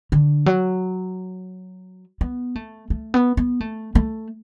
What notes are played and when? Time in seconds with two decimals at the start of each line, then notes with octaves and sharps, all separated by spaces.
0.12 D3
0.46 F#3
2.21 B3
2.56 A3
2.90 A3
3.14 B3
3.37 B3
3.60 A3
3.95 A3